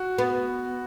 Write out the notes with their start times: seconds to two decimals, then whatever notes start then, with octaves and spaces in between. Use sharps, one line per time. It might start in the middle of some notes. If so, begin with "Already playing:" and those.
Already playing: F#4
0.18 B3